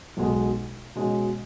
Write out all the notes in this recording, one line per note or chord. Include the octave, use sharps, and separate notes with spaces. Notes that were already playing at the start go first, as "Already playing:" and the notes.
B1 B2 G#3
B2 G#3 C#4